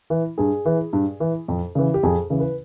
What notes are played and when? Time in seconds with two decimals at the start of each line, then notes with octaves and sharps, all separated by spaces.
0.10 E3
0.38 G2 G#4
0.66 E3
0.93 G2
1.20 E3
1.48 F2
1.75 C#3 E3
1.94 G4
2.03 F2 G#4
2.30 C#3 E3
2.40 B4